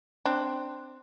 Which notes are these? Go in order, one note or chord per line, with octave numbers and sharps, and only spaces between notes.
C4 D4